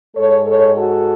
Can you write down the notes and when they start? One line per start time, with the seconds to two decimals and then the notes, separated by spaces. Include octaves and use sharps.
0.15 G#2 G#3 A4 C#5
0.46 A4 C#5
0.77 F#4 A4